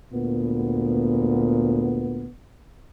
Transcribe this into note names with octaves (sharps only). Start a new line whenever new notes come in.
D2 A#2 B3